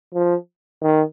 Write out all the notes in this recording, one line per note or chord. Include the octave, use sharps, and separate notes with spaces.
F3
D#3